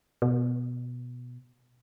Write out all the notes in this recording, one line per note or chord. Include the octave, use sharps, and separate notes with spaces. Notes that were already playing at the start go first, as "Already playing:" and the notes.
B2